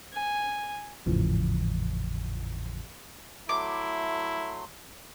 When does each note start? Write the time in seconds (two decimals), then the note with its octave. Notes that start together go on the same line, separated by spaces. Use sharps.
0.13 G#5
1.06 G#1 E2 A2 C#3 E3 F3
3.49 F#3 A3 E4 C6 D6